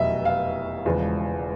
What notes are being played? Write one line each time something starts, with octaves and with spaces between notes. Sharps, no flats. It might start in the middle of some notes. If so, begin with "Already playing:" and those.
Already playing: F1 E2 B2 F#3 D#5 E5
F5
E1 E2 C#3 F3 G#3